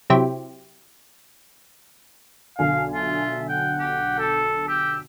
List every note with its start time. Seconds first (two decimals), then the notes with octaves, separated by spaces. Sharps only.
0.10 C3 F#3 E4 G4 C5
2.59 B1 D3 F5 G#5
2.95 F4 E5
3.49 F#5 G5
3.80 G4
4.19 A4
4.69 G4 E6